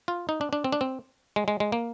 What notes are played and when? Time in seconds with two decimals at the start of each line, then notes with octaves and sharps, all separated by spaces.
0.08 F4
0.29 D#4
0.41 D4
0.53 D4
0.64 C4
0.72 D4
0.81 C4
1.36 G#3
1.48 G#3
1.60 G#3
1.72 A#3